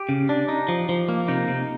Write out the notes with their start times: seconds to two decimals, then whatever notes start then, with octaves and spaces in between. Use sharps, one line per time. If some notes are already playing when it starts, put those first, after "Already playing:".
Already playing: G4
0.09 C#3
0.29 D4
0.48 D#4
0.68 F3
0.89 F3
1.09 A#3
1.28 C3 D#4
1.48 C3